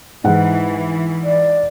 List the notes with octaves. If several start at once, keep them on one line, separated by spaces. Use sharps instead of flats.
G#2 E3 F#5
D5